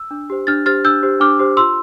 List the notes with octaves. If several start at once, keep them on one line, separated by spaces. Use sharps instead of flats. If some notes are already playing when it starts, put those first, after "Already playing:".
Already playing: E6
D4
G4 C5
D4 F6 A6
G4 C5 F6 A6
D4 E6 G6
G4 C5
D4 D6 F6
G4 C5
F4 C6 E6